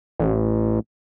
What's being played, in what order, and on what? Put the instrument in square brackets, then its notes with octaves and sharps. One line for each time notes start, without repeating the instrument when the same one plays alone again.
[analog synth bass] A1